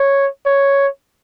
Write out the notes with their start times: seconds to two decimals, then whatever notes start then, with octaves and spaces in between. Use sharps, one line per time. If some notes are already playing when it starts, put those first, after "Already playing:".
Already playing: C#5
0.46 C#5